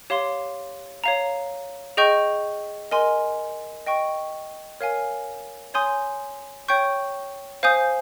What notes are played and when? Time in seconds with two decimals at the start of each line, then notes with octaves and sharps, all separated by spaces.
0.10 G4 C#5 F5 C6
1.04 C#5 F5 A#5
1.97 G#4 D#5 G5 C#6 G6
2.91 A#4 D#5 G#5 C6
3.86 D#5 G5 C#6
4.81 A#4 C#5 F5 G#5
5.74 C#5 G#5 C6 D#6 G6
6.68 C#5 G5 C#6 G6
7.63 C5 F5 G#5 D#6 G6